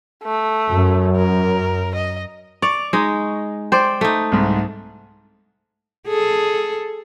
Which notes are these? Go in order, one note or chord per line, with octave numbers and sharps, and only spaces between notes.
A3
F#2
A#4
D#5
D5 C#6 F7
G#3 D#4
C5 D5 G5
A3 D#4
C2 G#2
G#4 A4